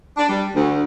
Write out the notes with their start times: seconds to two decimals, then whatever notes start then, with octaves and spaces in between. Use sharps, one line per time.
0.17 D4
0.29 G3
0.55 D2